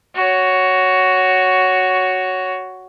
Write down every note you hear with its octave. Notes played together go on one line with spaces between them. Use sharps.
F#4 C#5